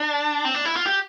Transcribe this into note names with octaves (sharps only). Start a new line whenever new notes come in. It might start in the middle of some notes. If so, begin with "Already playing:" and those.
Already playing: D4
C4
D4
E4
F4
G4